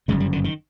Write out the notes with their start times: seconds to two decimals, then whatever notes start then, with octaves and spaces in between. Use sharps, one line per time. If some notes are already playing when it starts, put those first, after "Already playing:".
0.08 G1 F#2 C#3 G#3
0.20 G3
0.32 D3
0.44 D#3